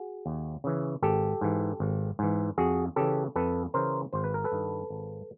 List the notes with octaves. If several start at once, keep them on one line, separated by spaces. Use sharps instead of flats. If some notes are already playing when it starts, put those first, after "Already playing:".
Already playing: F#4 G#4
D#2
C#3 E3
G#1 G4 A4
G#2 E3
G#1
G#2 E3
F2 F#4 G#4
C#3 E3 G4 A4
F2 A4 B4
C#3 E3 A#4 C5
G#1 C5
B4
A#4
A4 B4
G2 D#3
G#1